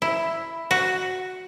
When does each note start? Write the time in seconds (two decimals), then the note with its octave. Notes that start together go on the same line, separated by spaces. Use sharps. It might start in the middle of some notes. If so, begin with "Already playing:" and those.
0.02 E4
0.71 F#4